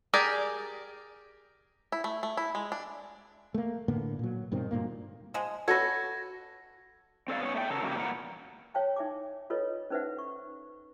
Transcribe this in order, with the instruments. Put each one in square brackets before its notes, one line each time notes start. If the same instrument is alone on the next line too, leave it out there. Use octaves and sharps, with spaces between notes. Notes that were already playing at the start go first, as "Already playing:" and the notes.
[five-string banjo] G4 G#4 A#4 D5
E4
A3
A3
E4
G#3
D4
[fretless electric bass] A3 A#3
A2 D3 A#3 B3
A#2 F#3
G2 B2 D#3 C4
D2 G2 A#2 A#3
[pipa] F3 G#3
[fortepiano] F#4 A4 [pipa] B4 C#5 [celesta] G#6 A#6
[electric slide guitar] C4 A4 D5 F5
B3 C#4 C#5
A3 D#5 G5
C#3 F#3 A4 A#4
G2 C#3 F#3 A#3 G4
E2 A#2 A#4 B4 F#5
[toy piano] C#5 F5 G5 A5
D#4 E5 G#5 D6
F4 A4 B4 C#5 D#5
C#4 D#4 B4 C5 E5 F#5
C#6